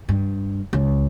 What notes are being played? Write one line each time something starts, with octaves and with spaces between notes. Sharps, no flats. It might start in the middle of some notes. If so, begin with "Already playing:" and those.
G2
C#2